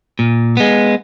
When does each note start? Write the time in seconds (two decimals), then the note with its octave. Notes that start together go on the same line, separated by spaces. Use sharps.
0.19 A#2
0.57 G#3 B3